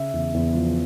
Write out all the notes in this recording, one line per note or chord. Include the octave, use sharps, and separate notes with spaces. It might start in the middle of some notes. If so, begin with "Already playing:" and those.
Already playing: C#3 E5
E2
E2
F3